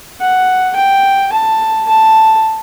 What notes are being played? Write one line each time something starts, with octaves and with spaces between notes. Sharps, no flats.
F#5
G5
A5
A5